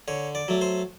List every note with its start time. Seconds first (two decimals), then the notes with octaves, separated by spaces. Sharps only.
0.08 D3 C#5
0.35 D5
0.48 F#3 A3
0.61 C5